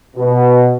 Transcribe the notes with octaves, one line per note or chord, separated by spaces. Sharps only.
B2